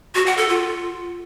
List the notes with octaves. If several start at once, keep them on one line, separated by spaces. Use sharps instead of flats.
F#4
F#5
A4
F4